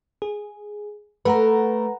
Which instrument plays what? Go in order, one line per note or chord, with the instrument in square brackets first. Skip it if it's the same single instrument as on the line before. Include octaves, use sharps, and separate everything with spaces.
[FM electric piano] G#4
[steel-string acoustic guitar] A3 A#4 [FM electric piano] B4 F#5 A#5